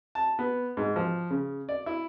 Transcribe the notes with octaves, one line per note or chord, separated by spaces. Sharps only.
A5
B3
G#2
F3
C#3
D5
E4